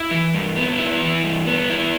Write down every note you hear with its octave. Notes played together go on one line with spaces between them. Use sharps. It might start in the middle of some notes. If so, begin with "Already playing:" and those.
Already playing: E4
E3
G2
B3
E4
E3
G2
B3
E4